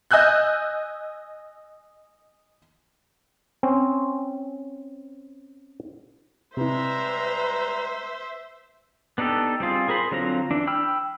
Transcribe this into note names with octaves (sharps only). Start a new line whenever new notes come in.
D#5 G#5 E6 F#6 G6
C4 C#4
C3 G3 G#3 E4 B4 C5 E5 A#5
B3 D4 D#4 G4 A4
G3 C4 F4 G#4
G#4 A#4 C5 B5
D3 F#3 C4 F4 A#5
E3 D4
G5 B5 E6 F6